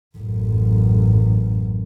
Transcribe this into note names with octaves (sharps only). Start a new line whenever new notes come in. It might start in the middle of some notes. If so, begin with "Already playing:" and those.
A1 F#2